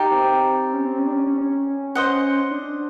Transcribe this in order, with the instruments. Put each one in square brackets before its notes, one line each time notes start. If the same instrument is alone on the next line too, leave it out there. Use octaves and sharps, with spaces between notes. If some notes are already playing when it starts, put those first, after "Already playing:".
Already playing: [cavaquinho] D#4 G4 A#4 D5
[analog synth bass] C4
C#4
C4
C#4
D4
C#4
C#4
C#4
[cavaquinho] C5 D#5 F#5
[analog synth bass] D4